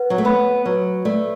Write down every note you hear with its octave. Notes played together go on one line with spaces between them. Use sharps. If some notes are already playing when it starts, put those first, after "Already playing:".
Already playing: B4 F#5
F#3
A3
B3 B5
F#3 B4
A3 D5